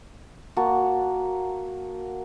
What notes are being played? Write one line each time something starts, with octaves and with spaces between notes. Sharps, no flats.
A#3 F#4 A5